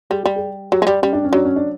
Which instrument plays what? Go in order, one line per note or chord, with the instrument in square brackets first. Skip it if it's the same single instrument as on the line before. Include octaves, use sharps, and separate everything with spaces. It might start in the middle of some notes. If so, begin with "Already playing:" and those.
[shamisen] G3 [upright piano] G#4
[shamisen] G3 [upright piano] G4
[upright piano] G#4
[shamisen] F#3 [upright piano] G4
[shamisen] G#3
[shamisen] G3 [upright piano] G4
[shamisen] G3 [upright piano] C#4
[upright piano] D4
C#4
[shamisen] F#3 [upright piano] D4
[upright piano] C#4
D4